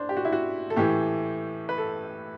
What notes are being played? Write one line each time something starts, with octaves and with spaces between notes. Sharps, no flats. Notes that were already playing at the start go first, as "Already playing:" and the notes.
Already playing: A2 D4 C5
G4
F#4
E4
F#4
A4
A2 E3 A3 G4
B4
A4